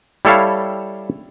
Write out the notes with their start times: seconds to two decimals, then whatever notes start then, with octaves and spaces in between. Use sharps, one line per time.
0.25 G3 E4 A4 C#5 F5